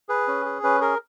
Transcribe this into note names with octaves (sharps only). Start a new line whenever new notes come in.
G#4 B4
C#4
G#4
C#4 B4
G#4 A#4